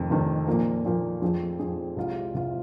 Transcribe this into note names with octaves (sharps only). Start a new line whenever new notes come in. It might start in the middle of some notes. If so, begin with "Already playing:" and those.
Already playing: F1 F2 D#3
F1 F2 D#3
A#2 F3 A#3
A#2 F3 A#3
F2 F3 C4 G#4
F2 F3 C4 G#4
C2 C3 G#3 F4
C2 C3 G#3 F4